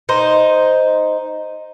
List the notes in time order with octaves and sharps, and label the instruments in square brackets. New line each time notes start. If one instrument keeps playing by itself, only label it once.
[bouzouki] D#4 C5